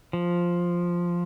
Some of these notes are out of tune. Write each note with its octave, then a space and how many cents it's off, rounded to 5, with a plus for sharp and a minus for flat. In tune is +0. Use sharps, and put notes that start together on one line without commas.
F3 +0